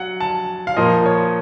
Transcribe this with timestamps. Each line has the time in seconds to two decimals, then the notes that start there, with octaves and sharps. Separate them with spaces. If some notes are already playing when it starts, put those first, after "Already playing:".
Already playing: F#3 F#5
0.20 A5
0.67 F5
0.76 A#2 F3 A#3 F4 D#5
1.06 C#5